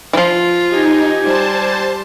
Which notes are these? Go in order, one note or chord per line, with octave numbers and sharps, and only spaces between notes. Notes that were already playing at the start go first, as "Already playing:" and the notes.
E3 F3 F4
D#4 G4 G#5
G3 C5 A5